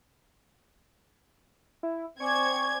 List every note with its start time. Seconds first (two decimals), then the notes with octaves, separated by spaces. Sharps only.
1.83 E4
2.20 C4 D5 G#5 C#6 D6 G#6